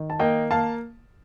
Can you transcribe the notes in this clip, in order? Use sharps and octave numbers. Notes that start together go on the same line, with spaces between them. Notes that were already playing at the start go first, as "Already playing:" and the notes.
Already playing: D#3
A5
A#3 D#5 G5
A#3 F5 A5